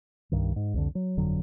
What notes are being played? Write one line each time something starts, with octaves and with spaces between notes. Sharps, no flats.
C2 G2 D#3
G#2
C2 F2 D3
F#3
G1 F2 D3 F#3